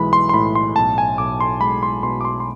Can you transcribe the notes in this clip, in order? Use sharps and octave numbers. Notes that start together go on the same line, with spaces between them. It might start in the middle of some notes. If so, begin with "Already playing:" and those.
Already playing: B1 E3 G#3 B5
C6
C6
A2 B5
C6
B1 A5
G#5
B1 D6
C6
G#3 B5
C6
B2 C6
D6
C6
C6